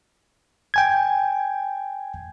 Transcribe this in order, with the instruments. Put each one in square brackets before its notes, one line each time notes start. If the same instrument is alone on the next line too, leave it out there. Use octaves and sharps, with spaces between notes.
[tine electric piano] G5 G#5 G#6